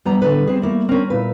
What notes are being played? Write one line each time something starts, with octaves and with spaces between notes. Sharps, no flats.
G2 G3 B3 A#5
A2 D3 B3 B4
C4 G#4
A3 A#3 E4
C4 C#4 A#4
A#2 E4 B4